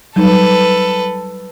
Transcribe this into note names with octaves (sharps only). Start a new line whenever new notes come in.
F#3 G3 D#4 A4 B4